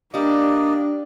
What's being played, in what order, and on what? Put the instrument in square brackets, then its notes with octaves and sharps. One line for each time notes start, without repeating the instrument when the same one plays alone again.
[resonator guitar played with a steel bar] G3 G4 [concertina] A#3 D5 D#5 [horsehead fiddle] D4